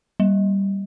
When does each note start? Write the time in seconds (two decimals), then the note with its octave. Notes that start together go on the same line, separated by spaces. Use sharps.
0.20 G3